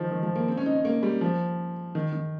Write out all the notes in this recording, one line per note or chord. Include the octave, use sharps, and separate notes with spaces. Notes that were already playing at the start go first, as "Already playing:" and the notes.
Already playing: D#3 F3
D#3
F3
A#3
C4
C#4
D#4
C#4
A#3
G3
F3
D#3
D#3